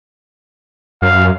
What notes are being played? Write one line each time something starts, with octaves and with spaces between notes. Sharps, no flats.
F#2 F5